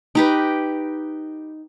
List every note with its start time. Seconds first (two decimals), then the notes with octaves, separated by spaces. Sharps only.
0.15 D#4 G4 B4